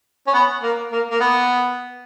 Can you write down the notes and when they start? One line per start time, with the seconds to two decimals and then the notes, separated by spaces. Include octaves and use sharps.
0.27 C#4
0.33 B3
0.63 A#3
0.92 A#3
1.10 A#3
1.20 B3